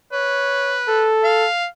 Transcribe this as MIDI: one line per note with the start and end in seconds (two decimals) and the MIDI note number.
0.12 1.08 71
0.12 0.79 73
0.88 1.48 69
1.24 1.66 77